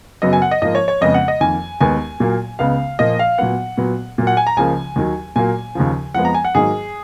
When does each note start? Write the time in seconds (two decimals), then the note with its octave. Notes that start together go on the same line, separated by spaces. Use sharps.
0.22 F#2 C#3 F#3 B3 D#5
0.33 G#5
0.42 F#5
0.51 D#5
0.62 G#2 F3 A#3 D#5
0.75 C#5
0.88 C#5
1.01 F2 C#3 G#3 B3 D#5
1.14 F#5
1.28 D#5
1.41 F2 D#3 A#3 G#5
1.80 D#2 D#3 G#3 B3 G#5
2.20 A#2 F#3 A#3
2.59 C#2 C#3 G#3 B3 F5
2.99 A#2 F3 A#3 D#5
3.19 F5
3.38 A#2 F#3 B3 F#5
3.77 A#2 F#3 B3
4.18 A#2 F#3 A#3
4.27 F#5
4.37 G#5
4.47 A#5
4.56 C#2 C#3 F3 A#3 G#5
4.96 D#2 D#3 F#3
5.36 A#2 F#3 A#3 G#5
5.75 D#2 C#3 F3
6.14 F2 F3 G#3 B3 F#5
6.25 A#5
6.34 G#5
6.45 F#5
6.55 G#2 D#3 F#3 A#3 G#4